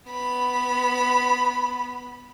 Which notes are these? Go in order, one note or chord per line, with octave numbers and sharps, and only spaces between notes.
B3 B5